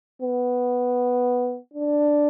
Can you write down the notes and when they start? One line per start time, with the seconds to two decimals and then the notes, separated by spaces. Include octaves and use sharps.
0.22 B3
1.73 D4